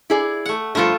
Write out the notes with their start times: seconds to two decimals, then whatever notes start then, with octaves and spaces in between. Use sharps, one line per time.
0.10 E4 G#4 D5
0.46 A3 F#5
0.75 G2 F3 A3 F4 A4